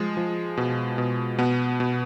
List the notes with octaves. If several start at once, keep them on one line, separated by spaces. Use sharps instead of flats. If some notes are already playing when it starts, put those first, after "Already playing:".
Already playing: F3 G#3
F3
B2
B2
B2 B3
B2